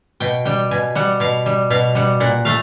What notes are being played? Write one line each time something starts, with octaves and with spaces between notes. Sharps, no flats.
B2 G5
G3 G5
B2 G#5
G3 F#5
B2 F5
G3
B2 F5
G3 F#5
A#2 F#5
A3 F5